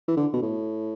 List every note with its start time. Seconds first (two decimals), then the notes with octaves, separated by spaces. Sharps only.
0.08 E3
0.17 D3
0.33 B2
0.43 A2